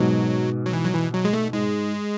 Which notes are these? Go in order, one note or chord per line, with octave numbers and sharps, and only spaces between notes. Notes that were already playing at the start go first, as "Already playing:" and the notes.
Already playing: G#2 B2 F#3
F#3
E3
F#3
E3
F#3
G#3
A3
G#2 G#3